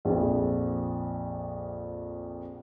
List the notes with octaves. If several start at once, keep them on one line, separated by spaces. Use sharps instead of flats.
A#1 F2